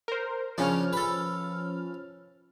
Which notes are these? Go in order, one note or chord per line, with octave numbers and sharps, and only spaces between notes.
A#4 C5
C#3 F3 C#4 D4 F6
A4 B4